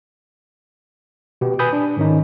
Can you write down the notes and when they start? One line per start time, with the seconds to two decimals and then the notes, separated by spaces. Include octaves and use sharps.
1.41 B2 B3 G4
1.59 B4 G#5 B5 D#6 G6
1.73 D4
1.97 G#2 D#3 C#4 D#4